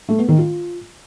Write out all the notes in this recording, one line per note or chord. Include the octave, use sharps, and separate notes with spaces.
A3
B3
D#3
F4